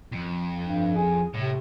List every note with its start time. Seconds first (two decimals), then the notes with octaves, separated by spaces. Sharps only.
0.12 F2
0.62 G2
0.95 G#4
1.34 A2 C3